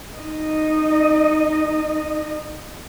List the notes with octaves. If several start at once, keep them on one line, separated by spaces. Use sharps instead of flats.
D#4 D#5